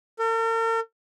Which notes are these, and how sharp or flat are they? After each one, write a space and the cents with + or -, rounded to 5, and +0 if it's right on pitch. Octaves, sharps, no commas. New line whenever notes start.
A#4 -45